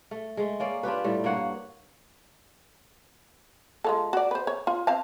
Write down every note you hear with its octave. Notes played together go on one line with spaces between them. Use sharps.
A3
G#3 A3
A#3 C#4 D5
D4 F4 G4 B4
A2 G3 A3
G2 A#3 C#5 F#5
G#3 F4 A4
F#4 D5
B4 C5
C#5
F4
C4 F5 A5